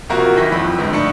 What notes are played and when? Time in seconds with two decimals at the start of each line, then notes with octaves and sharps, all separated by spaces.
0.10 C3 F3 A#3 F#4 A#4
0.36 D#3 E3 A#6 B6
0.52 C2 F2 B5
0.78 G1 G#2
0.93 A2 D4 D#4 C#7